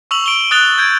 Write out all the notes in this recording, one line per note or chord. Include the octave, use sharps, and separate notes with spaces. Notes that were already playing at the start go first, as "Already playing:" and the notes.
C#6 E6 F7 F#7
D7 F7 G7
D#6 F#6 A6 F7 G7
G6 G#6 D7